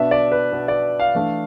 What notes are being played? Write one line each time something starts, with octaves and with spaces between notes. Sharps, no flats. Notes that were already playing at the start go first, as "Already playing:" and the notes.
Already playing: B2 B3 D4 E5
D5
B4
B2 B3 D4
D5
F5
E3 A3 D4